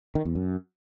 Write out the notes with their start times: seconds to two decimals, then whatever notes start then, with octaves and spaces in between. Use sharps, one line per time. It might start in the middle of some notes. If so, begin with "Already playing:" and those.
0.15 D#3
0.25 E2
0.35 F#2